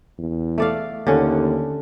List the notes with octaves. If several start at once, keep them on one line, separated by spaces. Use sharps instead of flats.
E2
A3 D5 F5
D#2 D3 C#4